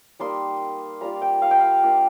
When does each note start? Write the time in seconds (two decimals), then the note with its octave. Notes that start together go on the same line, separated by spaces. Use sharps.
0.19 G3 A#3 D#4 C6
1.01 G3 A#3 F4 A#5
1.22 G5
1.42 F5
1.51 G5
1.59 F5
1.83 A#3 D4 F4